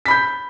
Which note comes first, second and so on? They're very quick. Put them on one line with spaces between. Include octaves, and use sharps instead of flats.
B6 B5 G6